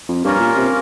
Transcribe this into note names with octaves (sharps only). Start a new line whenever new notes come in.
F2
G2 A#3 C#4 F4 A#4
A#2
C3